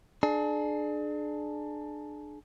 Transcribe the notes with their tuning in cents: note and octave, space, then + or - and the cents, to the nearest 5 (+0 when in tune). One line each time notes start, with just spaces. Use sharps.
D4 +25 G#4 +35